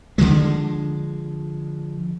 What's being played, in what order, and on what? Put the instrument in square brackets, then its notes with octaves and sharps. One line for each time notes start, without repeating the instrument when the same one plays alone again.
[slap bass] D3 E3 F3 G#3